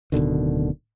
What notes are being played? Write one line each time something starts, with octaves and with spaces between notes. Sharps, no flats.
D1 B2 D3 D#3